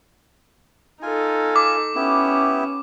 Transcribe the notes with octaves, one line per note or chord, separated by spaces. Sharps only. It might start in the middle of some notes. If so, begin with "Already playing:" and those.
D#4 F4 A4 G#5
D6
B3 C#4 E4 G4